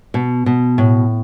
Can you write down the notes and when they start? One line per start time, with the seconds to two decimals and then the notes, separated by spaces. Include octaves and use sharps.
0.14 B2
0.46 B2
0.78 A2